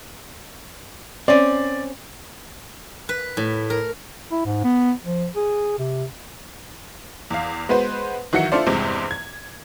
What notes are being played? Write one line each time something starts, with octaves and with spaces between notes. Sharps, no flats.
C4 C#4 D5
B4
A2
A#4
E4
G#2
B3
F3
G#4
C3
E2 F5
G#3 B3 F#4 B4 C5
D#3 E3 F#3 F#4 E5 C#7
D4 E4 F4 A4 C5 D5
E2 G2 C3 G#3 C4
G#6